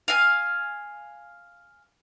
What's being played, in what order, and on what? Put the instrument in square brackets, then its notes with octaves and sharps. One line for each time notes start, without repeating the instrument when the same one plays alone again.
[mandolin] F5 G#5